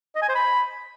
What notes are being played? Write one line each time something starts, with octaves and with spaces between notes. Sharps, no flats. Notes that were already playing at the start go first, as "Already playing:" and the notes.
D#5
G#5
C5
B5